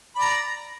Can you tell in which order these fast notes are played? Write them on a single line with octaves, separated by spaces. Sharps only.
B5 D5 A#5